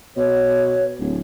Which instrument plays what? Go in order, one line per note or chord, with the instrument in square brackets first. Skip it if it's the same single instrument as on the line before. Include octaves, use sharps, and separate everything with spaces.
[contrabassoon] B2 [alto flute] C#5
[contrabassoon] D1